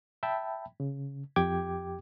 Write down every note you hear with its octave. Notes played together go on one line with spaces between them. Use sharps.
E5 G5 A5 B5
C#3
F2 G4 G5 D6 G#6